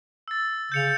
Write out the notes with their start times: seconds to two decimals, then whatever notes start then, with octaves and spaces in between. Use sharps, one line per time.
0.28 E6 A6
0.72 C#3 G6 C#7 F7